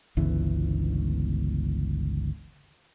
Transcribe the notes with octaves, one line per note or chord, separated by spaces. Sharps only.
G1 C#2 E3